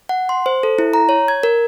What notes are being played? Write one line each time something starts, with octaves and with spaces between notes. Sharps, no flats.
F#5
C6
C5
A4
E4
A#5
C#5
G#6
A#4